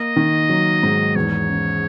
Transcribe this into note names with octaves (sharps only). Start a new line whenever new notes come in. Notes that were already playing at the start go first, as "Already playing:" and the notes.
Already playing: A#3 D#5
D#3
F#3
G#2
E2 C#5
C#3